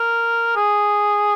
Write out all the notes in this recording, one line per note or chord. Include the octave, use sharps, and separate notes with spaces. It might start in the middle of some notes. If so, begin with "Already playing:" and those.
Already playing: A#4
G#4